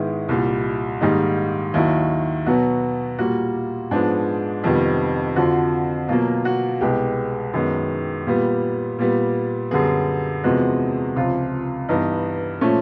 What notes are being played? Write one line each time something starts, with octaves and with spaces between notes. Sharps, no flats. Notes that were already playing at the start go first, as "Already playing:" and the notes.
Already playing: G#2 D#3 G#3 B3 E4
C2 A#2 G3
G#2 D#3 G3 A#3 D#4
D#2 D#3 F#3 E4
B2 F#3 B3 F#4
A#2 G3 A#3 F#4
G#2 F3 G#3 B3 D4
F2 C3 D#3 G3 B3
F2 D3 F3 F#4
B2 F#3 A#3 F4
F#4
C2 B2 G#3 B3 G4
F#2 D#3 G#3 B3
A#2 G3 B3
A#2 G3 B3
F#2 D3 G3 B3 G#4
E2 C3 F3 G#3 B3 F#4
C#2 C3 F3 F4
G2 E3 G3 B3 D#4
A#2 F3 A3 C#4